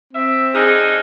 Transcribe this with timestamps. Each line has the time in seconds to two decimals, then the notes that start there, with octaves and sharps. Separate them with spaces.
0.14 C4 E5
0.55 D3 D#4 G#4 F6 F#6 A#6